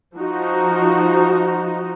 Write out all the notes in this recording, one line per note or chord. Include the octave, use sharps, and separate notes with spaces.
F3 D#4 F#4